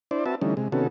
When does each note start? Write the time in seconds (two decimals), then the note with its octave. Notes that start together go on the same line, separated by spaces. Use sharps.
0.11 D4 E4 C5 D5
0.26 C4 F#4 B4 E5 A5
0.42 D3 E3 G3 A3 C#4 D#4
0.57 C3 G#3
0.72 C3 D#3 B3 C#4 F#4 A4